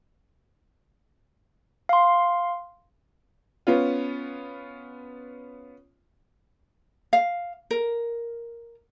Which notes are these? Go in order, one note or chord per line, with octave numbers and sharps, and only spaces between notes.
F5 C6
B3 C#4 F4
F5
A#4